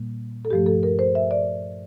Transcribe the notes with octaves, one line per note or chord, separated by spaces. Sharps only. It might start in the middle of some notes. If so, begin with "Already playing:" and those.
Already playing: A#2 G3 A#3
A4
G2 F3 A3 G4
A4
A#4
C5
E5
D5